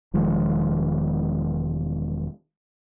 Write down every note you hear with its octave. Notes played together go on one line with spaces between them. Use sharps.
E1 D#3 F3 G#3